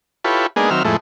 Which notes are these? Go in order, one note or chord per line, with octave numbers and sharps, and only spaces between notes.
E4 F4 G4 A4 B4 C#5
G#3 A#3 B3 D4 D#4 G#4
D#3 F#3 C4 E5 F6
F2 A2 G#3 A3 E4